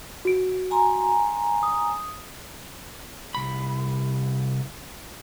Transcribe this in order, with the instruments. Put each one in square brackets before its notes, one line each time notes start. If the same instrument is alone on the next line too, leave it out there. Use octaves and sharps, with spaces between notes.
[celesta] F#4 D7
[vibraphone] G#5 A#5 C6
[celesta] D#6
[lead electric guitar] C2 B5